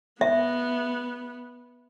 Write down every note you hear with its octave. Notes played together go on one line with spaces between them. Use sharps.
B3 E5